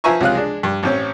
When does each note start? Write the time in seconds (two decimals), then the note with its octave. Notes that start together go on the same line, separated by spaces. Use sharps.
0.04 F3 B4 E5 G#5 A#5 C#6
0.21 C#2 C3 F4 G#4 F#6
0.35 G#3 D4
0.63 G2
0.83 A1 C4 C#4